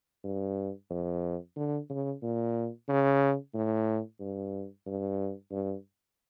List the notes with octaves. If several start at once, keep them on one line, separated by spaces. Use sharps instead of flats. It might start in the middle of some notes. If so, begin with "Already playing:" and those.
G2
F2
D3
C#3
A#2
C#3
A2
G2
G2
G2